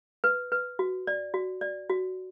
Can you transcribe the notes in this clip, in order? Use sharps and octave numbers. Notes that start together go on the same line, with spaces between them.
B4
B4
F#4
D5
F#4
D5
F#4